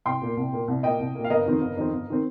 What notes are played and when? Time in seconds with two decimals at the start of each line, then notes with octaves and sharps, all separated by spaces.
0.05 C2 G5 C6
0.22 A#2 A#3
0.37 C2
0.53 A#2 A#3
0.68 C2
0.83 A#2 A#3 D#5 G5
0.99 C2
1.15 A#2 A#3
1.24 F5
1.30 G1 A#4 D#5
1.46 F2 D#3 C4
1.61 G1
1.77 F2 D#3 C4
1.93 G1
2.10 D#3 C4